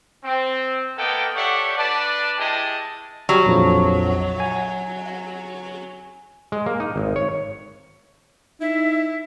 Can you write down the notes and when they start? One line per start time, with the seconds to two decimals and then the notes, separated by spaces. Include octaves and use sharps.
0.24 C4
0.98 A#3 B3 A4 D#5 G5
1.36 G4 A4 C#5 D5 E5 F#5
1.77 D4 B4 D5 A5
2.38 G#3 E4 G4 G#4 D#5 A5
3.29 F#3 G3
3.46 A#1 F2 F3
4.40 G#5
6.52 G#3
6.66 A#3
6.80 D#4
6.96 G#1
7.16 C#5
8.61 D#4 E4 E5